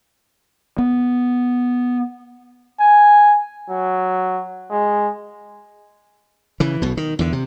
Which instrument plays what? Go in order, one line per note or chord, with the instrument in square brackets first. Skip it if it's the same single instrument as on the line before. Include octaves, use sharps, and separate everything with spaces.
[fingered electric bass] B3
[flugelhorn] G#5
F#3
G#3
[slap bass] C#3 E3
B1 B2
D#3
E2 D3
C3